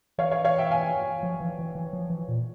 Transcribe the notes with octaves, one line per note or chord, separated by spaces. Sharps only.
E3 C#5 F5
C#5 F5
C#5 F5
E5 G5
F5 G#5
F3
E3
E3
E3
F3
E3
A#2